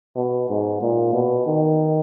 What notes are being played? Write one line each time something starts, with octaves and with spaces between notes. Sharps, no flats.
B2
G#2
A#2
B2
D#3